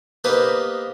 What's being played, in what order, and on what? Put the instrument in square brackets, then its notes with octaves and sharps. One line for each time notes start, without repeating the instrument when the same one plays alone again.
[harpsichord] A#3 B3 D#4 G4 B4 C5